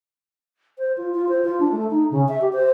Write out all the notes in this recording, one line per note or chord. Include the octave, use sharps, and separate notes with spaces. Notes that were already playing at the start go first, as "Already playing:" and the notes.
C5
F4
F4
C5
F4
D4
A3
D#4
C#3
E5
G4
C5